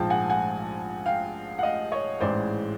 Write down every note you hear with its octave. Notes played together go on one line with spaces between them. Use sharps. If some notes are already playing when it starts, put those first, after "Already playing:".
Already playing: A#1 G#2 F3 G5 A5
F#5 G#5
F#5 G#5
F5 G5
F#5
D#5 F5
C#5 D#5
A1 G#2 E3 G#3 C5 D5